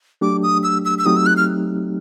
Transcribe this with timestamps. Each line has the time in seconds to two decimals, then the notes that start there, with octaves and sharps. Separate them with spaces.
0.21 F#3 A3 D4 G4 D6
0.43 D#6
0.63 E6
0.85 E6
0.98 E6
1.05 F#3 A3 C4 D#4 G4 D#6
1.16 E6
1.26 F#6
1.37 F6